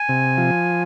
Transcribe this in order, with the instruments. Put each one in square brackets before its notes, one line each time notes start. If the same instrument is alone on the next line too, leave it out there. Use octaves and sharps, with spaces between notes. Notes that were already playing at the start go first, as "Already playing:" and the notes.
Already playing: [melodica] G#5
[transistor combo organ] C3
F3